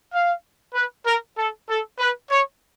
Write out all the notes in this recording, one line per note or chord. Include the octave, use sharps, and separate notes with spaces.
F5
B4
A#4
A4
A4
B4
C#5